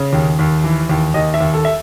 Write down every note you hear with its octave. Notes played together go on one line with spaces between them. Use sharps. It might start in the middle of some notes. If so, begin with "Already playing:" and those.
Already playing: C#3
D#2
D#2
E3
D#2
D#2 D#5
E5
D#2
A4
E5